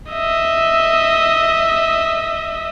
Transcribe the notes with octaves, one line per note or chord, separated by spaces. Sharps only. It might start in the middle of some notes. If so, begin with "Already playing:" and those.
D#5 E5